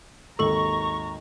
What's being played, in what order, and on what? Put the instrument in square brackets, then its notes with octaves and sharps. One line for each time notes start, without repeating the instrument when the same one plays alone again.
[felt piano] G#1 D#2 [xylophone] A4 F#7 [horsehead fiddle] A#5 [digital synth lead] C#6